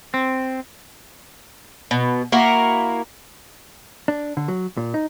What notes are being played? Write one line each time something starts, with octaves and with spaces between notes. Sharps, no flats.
C4
B2
A#3 E4 F#4 A#4
D4
D3
F#3
A#2
D#4